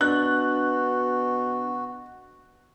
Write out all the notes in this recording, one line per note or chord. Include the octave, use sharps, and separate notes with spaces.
B2 D4 F#4 F#6